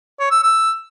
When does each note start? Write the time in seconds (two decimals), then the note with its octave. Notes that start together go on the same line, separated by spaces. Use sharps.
0.19 C#5
0.31 E6
0.43 E6